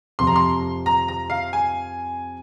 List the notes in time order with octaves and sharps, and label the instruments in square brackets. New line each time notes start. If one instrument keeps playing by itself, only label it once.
[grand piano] F2 C3 F3 [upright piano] C6
[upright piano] A#5
C6
A#5
A#5
F5
G#5